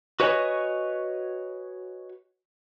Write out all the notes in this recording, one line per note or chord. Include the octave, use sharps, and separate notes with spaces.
F#4 B4 C#5 D#5 G#5